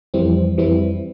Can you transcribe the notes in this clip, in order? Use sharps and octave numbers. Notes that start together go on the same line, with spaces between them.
F2 E3 G3 C4 E4
F2 E3 G3 C4 E4